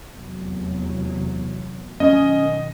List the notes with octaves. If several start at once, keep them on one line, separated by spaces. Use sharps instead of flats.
F1 E2 F#3
B1 D#3 C#4 D#5